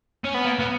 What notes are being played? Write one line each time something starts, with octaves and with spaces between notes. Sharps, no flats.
C#4
B3
A#3
B3